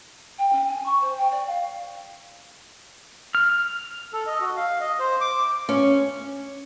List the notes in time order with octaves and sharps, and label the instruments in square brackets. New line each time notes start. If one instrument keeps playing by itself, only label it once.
[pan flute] G5
C#4
G#5
C#6
C5
G5
D5
F5
[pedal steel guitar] F6
[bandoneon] A4
D#5
F#4
F5
D#5
C5
D6
[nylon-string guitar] C#4